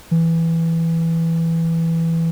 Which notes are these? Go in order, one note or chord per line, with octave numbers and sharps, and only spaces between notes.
E3